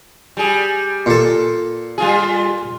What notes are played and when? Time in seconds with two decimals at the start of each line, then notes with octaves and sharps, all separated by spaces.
0.37 G3 G#4
1.06 A#2 A4
1.98 G3 F4 G#4